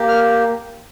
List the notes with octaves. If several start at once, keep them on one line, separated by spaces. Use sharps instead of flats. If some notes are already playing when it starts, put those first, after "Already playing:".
Already playing: A#3 G4
F6